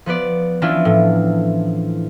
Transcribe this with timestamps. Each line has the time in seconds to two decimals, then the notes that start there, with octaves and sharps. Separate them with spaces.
0.06 F3 B3 B4 D5
0.62 E3 F3 C#4 D4 E4 F4
0.85 A2